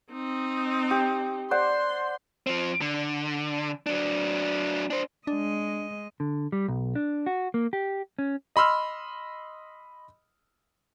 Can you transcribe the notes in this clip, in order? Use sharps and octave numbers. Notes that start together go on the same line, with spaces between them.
C4 D#4
G4
C5 D5 F#5 C6
F3 C4
D3
F#3 D4
D4 C5
G#3 D4 D#5
D3
G3
B1
D4
F#4
A#3
G4
C#4
D#5 B5 C6 E6 F6